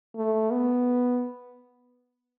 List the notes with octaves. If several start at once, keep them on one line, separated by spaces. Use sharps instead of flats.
A3
B3